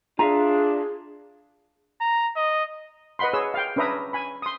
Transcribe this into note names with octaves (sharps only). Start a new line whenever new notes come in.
D4 F4 G#4 E5 F5 A#5
A#5
D#5
B4 D#5 F#5 B5 C6
G#4 C#5 E6
F5 G5
C#4 D4 B4 E5 A#5 D#6
G#5 B5
C6 D#6